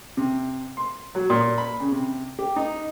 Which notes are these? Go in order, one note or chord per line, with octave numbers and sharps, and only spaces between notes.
C3
C6
F#3
A#2
B5
C#3
C3
G4
D#4